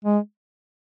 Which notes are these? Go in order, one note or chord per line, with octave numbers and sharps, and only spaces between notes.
G#3